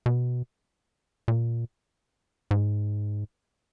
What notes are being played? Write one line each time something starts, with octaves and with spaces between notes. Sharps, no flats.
B2
A#2
G#2